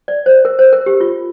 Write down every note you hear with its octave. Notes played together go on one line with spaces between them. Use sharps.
D5
C5
A#4
C5
A#4
G4
F4